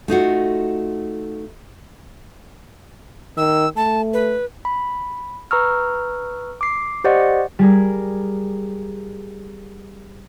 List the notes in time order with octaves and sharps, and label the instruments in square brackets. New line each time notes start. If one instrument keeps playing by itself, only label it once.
[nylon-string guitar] A3 D#4 F4 F#4
[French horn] D#3 [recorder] E6
[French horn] A3 [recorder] A5
[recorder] B4
[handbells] B5
B4 A#5 C#6 E6 F6
D6 C7
G4 C5 D5 D#5 F#5 C#6
[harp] G3 G#4 A#4